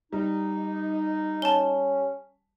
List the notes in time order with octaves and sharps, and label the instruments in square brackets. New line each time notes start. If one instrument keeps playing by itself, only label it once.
[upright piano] G3 [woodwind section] D#4
[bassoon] C#4 [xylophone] A5 G7